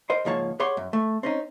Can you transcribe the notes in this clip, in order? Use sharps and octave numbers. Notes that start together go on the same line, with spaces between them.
A#4 C5 D#5
C#2 G#2 F3 A#3 C#5 A5
G4 G#4 C#5 F#5 C6
F#2
A3
C4 C#4 D#4